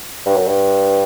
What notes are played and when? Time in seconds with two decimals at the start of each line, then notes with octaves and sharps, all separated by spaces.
0.26 G2
0.36 F#2
0.47 G2